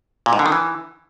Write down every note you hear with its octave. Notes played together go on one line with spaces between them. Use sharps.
A#2
G#2
D3
D#3
E3